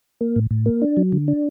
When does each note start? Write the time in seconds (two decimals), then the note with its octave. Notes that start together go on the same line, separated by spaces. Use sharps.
0.21 A#3
0.36 A2
0.51 A2
0.66 A#3
0.82 D4
0.97 F#3
1.12 D3
1.28 D4